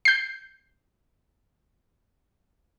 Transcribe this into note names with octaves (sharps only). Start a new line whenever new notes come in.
G6 C7